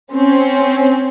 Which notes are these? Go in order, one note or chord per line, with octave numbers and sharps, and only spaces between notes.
C4 C#4